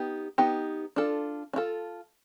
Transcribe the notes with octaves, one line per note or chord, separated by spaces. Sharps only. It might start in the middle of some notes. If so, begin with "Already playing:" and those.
Already playing: B3 D#4 G4
B3 D#4 G4
D4 F4 A4
D4
F4 A4